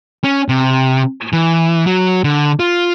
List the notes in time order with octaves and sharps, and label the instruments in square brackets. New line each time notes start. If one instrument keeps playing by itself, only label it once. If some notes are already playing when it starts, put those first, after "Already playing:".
[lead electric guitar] C#4
C3
E3
F#3
D3
F4